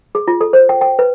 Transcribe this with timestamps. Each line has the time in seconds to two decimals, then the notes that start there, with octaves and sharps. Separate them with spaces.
0.15 G#4
0.28 F4
0.41 A4
0.53 C5
0.69 G5
0.81 G5
0.99 B4